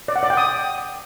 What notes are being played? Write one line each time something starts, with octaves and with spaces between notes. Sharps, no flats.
D5
F#5
D5
G5
D#6